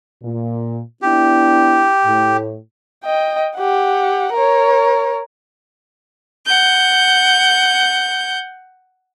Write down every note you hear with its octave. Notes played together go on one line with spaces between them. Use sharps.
A#2
B3 D4 E4 G4
A2
D#5 G5
G4 F#5
A#4 C#5
F#5 G6